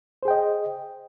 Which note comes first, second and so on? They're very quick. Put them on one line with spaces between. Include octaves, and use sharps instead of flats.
C5 G#4 G5 D#5